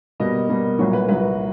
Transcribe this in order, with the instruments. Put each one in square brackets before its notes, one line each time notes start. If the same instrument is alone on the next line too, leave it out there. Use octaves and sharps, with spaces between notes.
[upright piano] B2 G3 A#3 D#5
B2 G3 A#3
C2 A#2 F#3 C#5
B4
C2 A#2 F#3 B4